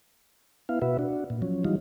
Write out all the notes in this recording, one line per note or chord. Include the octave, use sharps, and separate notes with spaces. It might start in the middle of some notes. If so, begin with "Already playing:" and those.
B3 E4 F5
B2 F#4 B4 E5
D4 F#4
A#2
F3 F#3 C#4
E3 F#3 G3 D#4 F4